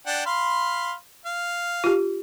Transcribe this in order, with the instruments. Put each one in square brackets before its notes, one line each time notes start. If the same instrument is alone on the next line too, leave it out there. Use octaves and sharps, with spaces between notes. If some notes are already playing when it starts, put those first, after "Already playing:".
[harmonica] D4 F#5 G5
F5 B5 C6
F5
[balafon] F4 G4